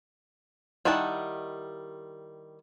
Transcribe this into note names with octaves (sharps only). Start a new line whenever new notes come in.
D#3 G3 E4 F#5 A5